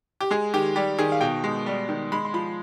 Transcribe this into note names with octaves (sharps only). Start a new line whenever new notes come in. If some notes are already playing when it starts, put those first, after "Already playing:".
G4
G#3 G#4
D#3 G4
G3 G4
D#3 G#4
F5
B2 G5
G#3
G3
D#3
G#3 B5
C6
F3 B5